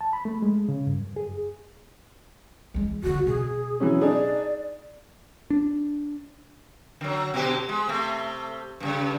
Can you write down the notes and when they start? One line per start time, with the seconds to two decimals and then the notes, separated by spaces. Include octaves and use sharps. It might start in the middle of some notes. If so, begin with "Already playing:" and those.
0.01 A5
0.13 B5
0.25 A3
0.42 G#3
0.69 C#3
0.87 G2
1.01 F#2
1.16 G#4
2.74 E3 G#3
3.03 E2 D3 F#4
3.26 B2 G#4
3.80 E3 F#3 C#4
4.01 D4 D#4 G#4 D5
5.50 D4
7.01 D3 F#3
7.34 B2 D3 G4
7.69 G#3
7.87 C3 A3
8.80 G2 A#2 C#3